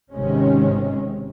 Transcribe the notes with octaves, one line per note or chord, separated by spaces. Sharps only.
G#1 C3 D#3 G#3 C#4